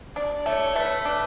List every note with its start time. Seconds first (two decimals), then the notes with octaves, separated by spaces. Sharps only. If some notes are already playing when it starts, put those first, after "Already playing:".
0.16 D4 D5
0.46 A3 C#5
0.76 A3 B4
1.05 D4